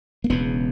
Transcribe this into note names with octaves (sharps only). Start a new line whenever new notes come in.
A#3
E1 E2 C#3 B3